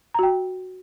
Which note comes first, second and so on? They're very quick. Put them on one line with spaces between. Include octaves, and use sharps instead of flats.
A#5 F#4 G5